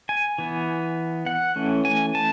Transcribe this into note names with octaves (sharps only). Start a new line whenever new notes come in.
G#5
E3 B3
F#5
E3 A3 C#4
G#5
A5